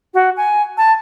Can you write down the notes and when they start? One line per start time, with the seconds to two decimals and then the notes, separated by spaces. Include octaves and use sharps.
0.14 F#4
0.37 G#5
0.78 A5